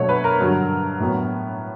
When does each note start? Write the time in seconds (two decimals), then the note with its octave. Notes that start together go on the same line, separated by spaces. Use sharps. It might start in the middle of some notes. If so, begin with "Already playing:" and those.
Already playing: B2 F#3 A3 C#5
0.09 B4
0.24 A#4
0.40 G2 D3 F#3
1.00 A2 F#3 B3